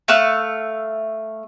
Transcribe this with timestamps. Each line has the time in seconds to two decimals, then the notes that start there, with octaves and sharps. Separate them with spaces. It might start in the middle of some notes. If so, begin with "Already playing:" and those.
0.08 A3 F5 E6 F#6